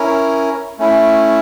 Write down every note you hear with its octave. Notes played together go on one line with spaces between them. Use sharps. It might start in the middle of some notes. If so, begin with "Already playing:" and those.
Already playing: C#4 E4 A#4
A3 C#4 E4